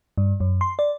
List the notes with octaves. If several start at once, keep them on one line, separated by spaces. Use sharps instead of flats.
G2
F#2
C6
D5